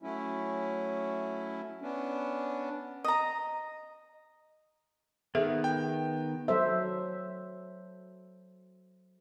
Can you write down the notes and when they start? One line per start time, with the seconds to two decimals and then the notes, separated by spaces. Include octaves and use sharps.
0.02 F#3 A3 C#4 E4
1.82 B3 C#4 D4
3.04 D#5 A#5
5.35 D#3 B3 G#4 A4 E5
5.64 G5
6.48 F#3 A4 C5 E5